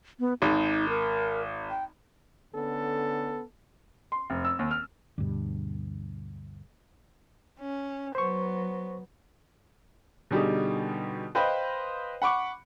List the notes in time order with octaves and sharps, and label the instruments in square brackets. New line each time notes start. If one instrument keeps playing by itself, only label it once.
[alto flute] B3
[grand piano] G#1 [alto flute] D#4
[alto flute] A#4
G5
[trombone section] D3 B3 C#4 A4
[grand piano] C6
F1
E6
D#2
F6
[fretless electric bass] D2 G2 B2
[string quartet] C#4
[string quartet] F#3 B3 [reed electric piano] C5 C#6
[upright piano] B2 D3 G3 D#4 G4 G#4
B4 C5 D#5 F5 G5 B5
F#5 B5 C#6 D6